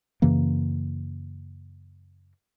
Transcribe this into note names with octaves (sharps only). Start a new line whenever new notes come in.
F#2 C#3 E3 A#3